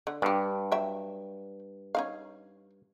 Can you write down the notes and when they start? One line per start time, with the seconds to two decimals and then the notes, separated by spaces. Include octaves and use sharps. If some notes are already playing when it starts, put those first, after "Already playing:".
0.07 D3
0.22 G2 D4 G4
0.72 F#3 E5 G5
1.95 C#4 D#4 F5